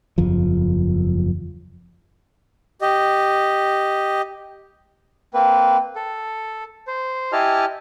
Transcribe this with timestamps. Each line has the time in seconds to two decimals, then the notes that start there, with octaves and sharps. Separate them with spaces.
0.18 F#1 E2 F3
2.82 G4 D#5
5.34 A#3 C4 B4
5.96 A4
6.87 C5
7.32 E4 G4 D#5 G#5 A5 F6